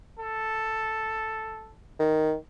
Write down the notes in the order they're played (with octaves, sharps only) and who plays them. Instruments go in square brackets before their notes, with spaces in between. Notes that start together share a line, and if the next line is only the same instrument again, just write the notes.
[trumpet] A4
[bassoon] D#3